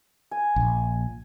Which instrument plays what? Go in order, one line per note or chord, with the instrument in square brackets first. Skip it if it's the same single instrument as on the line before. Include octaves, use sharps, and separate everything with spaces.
[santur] G#5
[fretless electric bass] A#1